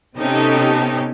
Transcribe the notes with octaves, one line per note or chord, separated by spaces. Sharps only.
C3 B3 C#4 D#4 G4 A4